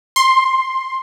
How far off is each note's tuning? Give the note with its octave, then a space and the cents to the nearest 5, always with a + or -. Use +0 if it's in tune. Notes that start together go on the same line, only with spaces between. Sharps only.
C6 +15